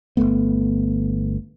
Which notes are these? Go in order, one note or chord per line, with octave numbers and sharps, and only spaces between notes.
G1 E2 A3 B3